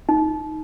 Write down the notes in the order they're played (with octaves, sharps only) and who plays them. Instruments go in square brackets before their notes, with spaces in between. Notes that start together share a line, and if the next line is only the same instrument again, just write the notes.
[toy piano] D#4